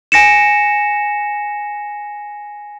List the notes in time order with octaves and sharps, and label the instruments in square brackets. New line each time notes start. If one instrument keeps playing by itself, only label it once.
[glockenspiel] G#5 A#6 C#7 E7